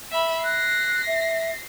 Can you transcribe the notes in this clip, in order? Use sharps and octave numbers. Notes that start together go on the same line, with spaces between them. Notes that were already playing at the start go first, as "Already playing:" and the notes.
E5 B5
F#6 A#6 C7
E5